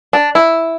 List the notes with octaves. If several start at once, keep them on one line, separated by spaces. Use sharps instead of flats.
D4
E4